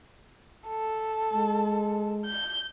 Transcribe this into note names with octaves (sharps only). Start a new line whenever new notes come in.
A4
G#3
G6